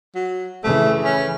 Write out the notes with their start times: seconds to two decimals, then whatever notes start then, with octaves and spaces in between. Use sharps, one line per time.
0.15 F#3
0.64 C#3 E3 A3
1.05 C#4